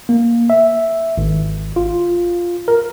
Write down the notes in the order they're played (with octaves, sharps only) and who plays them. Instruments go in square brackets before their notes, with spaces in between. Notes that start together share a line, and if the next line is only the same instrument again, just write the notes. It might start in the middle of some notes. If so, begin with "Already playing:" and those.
[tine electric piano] A#3
E5
G#1
F4
A#4